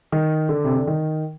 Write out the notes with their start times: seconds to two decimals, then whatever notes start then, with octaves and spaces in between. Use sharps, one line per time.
0.12 D#3
0.49 D3
0.64 C3
0.75 D3
0.87 D#3